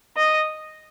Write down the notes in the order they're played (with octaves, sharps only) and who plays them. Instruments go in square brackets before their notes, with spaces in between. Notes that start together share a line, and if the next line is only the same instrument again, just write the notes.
[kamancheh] D#5